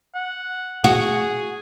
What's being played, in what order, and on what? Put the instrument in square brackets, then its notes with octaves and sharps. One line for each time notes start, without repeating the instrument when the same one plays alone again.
[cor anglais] F#5
[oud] F#4 [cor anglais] G#4